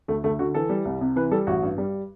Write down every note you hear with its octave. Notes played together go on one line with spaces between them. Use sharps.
D2 A3
D2 A3
D3 F#4
E3 A4
G3
C2
C3
E3 B4
G3 A4
A1 F#4
G2
G3